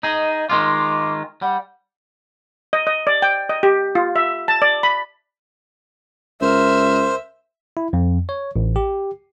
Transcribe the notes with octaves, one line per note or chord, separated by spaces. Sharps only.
D#4 G#4 D#5
D#3 G#3 F4 D6
G3 F#5
D#5
D#5
D5
G5
D#5
G4
F4
E5
A5
D5
B5
C#2 A#4 C5 E5
E4
F2
C#5
A1
G4